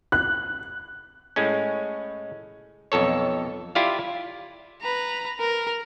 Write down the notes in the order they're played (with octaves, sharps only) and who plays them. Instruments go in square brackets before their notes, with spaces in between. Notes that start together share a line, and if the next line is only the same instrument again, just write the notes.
[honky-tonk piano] F#6
[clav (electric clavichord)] A2 G#3 C#4
B1 F2 A4 C#5
E4 F4 G4 D5 F5
[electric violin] B4 A#5
A#4